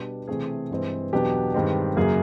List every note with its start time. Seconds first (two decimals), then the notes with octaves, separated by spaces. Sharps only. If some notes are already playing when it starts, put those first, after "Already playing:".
Already playing: B2 G3 B3 D4
0.28 C3 E3 A3 C4 G#4
0.70 G2 E3 G#3 C4
1.12 E2 B2 F#3 B3 D4 G4
1.54 G2 D#3 G#3 C4
1.96 F#2 C#3 F#3 A#3 G#4